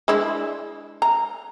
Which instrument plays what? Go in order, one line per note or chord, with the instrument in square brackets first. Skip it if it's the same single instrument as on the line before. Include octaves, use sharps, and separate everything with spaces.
[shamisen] G#3 D4 E4
A#5